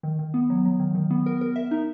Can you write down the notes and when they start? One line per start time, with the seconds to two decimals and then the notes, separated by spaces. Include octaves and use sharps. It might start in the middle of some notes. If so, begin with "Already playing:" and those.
0.03 D#3
0.19 D#3
0.34 B3
0.50 F#3
0.65 F#3
0.79 D#3
0.95 D#3
1.10 B3
1.26 A#4
1.41 A#4
1.56 E5
1.71 D#4